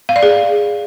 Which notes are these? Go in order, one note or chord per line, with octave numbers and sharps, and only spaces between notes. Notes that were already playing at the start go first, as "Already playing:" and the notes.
F5
D5
G#4